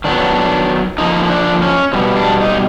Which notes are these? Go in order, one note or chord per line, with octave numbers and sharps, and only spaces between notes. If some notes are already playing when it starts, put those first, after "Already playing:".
D#3 F#3 B3 D4
D3 F3 A#3 D#4
D4
C#4
B2 G3 B3 C4
D4
D#4